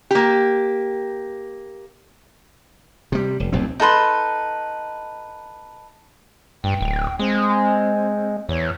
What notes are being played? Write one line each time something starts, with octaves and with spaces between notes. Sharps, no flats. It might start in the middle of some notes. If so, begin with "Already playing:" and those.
A#3 G4
C3 G3
F1
D1 B1 E2 C4
D#4 A4 B4 C6
G2 G5
D1
G#3 C4
E2 C#5